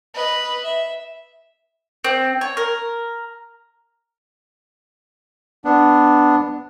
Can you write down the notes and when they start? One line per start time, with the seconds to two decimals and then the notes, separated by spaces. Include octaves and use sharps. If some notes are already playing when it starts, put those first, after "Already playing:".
0.14 B4 D#5
0.65 E5
2.04 C4
2.41 C#5
2.57 A#4
5.65 B3 D4